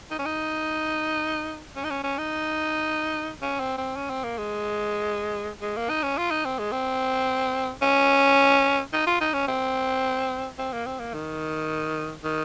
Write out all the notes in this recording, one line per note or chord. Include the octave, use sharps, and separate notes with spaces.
D#4
C#4
D#4
C#4
D#4
C#4
C#4
D#4
C#4
C4
C4
C#4
C4
A#3
G#3
G#3
A#3
D#4
C#4
F4
D#4
C4
G#3
C4
C#4
D#4
F4
D#4
C#4
C4
C4
A#3
C4
A#3
D#3
D#3